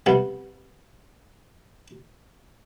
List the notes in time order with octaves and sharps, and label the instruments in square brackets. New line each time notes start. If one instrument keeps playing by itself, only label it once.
[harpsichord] C3 G3 B3